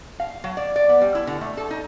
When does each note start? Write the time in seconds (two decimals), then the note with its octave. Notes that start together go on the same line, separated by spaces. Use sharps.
0.20 F5
0.44 F#3
0.57 D5
0.76 D5
0.89 B3
1.01 G3
1.15 E4
1.27 D3
1.41 A3
1.57 A4
1.71 D#4